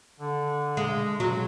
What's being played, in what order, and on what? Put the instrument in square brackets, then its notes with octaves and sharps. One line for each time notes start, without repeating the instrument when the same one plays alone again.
[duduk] D3
[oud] G#3
[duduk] C#3 [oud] F#3